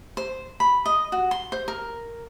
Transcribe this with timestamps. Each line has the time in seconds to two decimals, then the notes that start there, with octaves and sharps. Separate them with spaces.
0.17 C5
0.60 B5
0.86 D#5
1.12 F#4
1.31 C6
1.52 C5
1.68 A#4